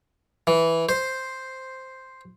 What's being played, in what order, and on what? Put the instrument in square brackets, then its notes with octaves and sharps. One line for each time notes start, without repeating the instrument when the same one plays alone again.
[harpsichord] E3
C5